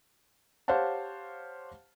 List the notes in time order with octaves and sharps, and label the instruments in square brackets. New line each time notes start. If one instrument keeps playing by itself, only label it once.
[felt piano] G4 C5 C#5 F5 F#5 A5